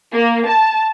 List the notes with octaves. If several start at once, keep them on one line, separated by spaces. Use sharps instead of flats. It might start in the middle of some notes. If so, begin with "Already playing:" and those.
A#3
A5